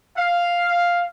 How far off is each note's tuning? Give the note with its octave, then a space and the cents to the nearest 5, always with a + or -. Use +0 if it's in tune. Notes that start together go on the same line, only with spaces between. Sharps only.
F5 +0